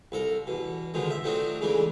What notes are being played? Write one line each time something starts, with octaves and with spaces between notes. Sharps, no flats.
C2 A4 A#4
E2 B2
B2 D3 D#3 F3 G#3
E5
F3 F#3 A3 C4 D4 D#4
C#3 E3 G#3 A3 D4